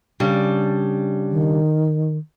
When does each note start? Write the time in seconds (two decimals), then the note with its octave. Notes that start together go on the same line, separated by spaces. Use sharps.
0.20 C#3 G3 D4
1.31 D#3